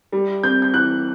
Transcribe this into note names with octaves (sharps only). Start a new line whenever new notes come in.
G3
C4 G6
G6
E3 F#6